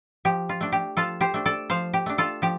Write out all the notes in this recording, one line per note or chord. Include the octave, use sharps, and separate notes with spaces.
F3 G4
F4
A3 D4
G4
F3 F4 A4
G4 C5
A3 D4
A4 D5
F3 C5 F5
G4
A3 D4
F4 A4
F3 G4